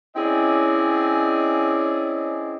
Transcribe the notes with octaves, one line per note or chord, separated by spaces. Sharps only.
C4 C#4 E4 G#4 D5 D#5